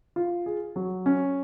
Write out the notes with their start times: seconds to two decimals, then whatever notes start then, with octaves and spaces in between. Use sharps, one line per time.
0.16 F4
0.46 G#4
0.76 F#3
1.06 C#4